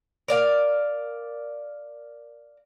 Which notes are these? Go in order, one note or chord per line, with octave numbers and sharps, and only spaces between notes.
A#4 D5 F5